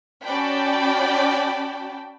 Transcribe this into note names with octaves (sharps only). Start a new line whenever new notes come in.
C#4 F#4 D5 G5 A5 B5